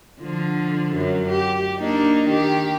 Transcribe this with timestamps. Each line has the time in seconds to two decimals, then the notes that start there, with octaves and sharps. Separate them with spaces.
0.21 D3 F3
0.94 F#2 F#3
1.29 G4
1.78 A#3 D4 D#4
2.28 D#3 G4